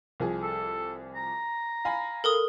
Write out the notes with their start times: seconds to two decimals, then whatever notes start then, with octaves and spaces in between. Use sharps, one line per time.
0.20 C2 F3 G#4
0.43 A4
1.15 A#5
1.85 F5 G#5 B5
2.24 A4 A#4 D#6